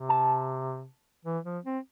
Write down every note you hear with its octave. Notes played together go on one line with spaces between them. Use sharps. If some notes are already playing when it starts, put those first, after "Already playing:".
Already playing: C3
A5
E3
F3
C4